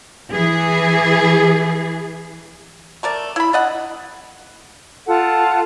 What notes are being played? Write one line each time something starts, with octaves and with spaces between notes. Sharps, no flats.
E3 G#4
A3 A#4 D5
E4 B5
D4 D#5 F#5
F4 A4 F#5 A5